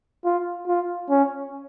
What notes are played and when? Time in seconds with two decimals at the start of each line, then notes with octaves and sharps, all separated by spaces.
0.25 F4
0.67 F4
1.10 C#4